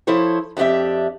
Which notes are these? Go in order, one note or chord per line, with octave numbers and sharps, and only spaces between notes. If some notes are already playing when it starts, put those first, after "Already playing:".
F3 E4 A4 C5 C#5
F2 D4 F#4 G4 E5